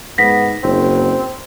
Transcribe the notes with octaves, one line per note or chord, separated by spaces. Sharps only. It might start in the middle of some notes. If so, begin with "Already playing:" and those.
G#2 B3 A#6 B6
F#1 C4